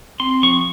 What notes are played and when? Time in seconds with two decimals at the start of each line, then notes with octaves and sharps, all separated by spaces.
0.20 C4 C6
0.43 F3 C#6